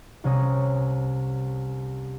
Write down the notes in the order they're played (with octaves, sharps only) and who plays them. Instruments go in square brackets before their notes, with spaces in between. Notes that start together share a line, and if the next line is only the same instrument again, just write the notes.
[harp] C2 C3 C#4 A#5 D#6